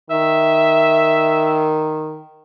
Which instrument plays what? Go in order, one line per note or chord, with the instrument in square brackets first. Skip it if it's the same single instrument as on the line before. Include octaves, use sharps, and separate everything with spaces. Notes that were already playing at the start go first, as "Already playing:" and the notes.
[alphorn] D#3 [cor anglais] E5